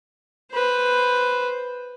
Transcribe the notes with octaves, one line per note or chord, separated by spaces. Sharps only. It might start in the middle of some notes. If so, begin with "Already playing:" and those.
B4 C5